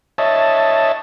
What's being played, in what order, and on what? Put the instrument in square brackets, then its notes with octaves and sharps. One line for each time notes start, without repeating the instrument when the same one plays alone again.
[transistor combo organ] C#5 D#5 E5 A5